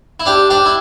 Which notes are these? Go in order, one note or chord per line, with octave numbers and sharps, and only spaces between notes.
E4
D4 G4
D4 G4
E4